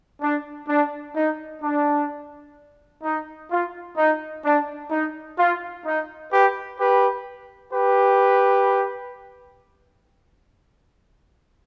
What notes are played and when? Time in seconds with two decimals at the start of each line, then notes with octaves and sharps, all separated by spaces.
0.21 D4
0.69 D4
1.16 D#4
1.63 D4
3.03 D#4
3.50 F4
3.97 D#4
4.44 D4
4.91 D#4
5.39 F4
5.85 D#4
6.32 G4 B4
6.79 G4 B4
7.73 G4 B4